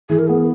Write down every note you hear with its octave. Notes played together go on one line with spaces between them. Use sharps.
E3 G#4
A#4
B3 G#4